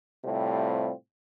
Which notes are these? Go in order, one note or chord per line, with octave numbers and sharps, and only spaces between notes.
A2 C3 G3 C4 F4